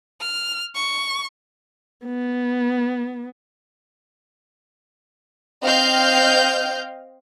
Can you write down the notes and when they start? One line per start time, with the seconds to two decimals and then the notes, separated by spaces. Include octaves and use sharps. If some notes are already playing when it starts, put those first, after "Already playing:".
0.20 F6
0.75 C#6
2.05 B3
5.63 C4 D#5 F5 G5 F6 G6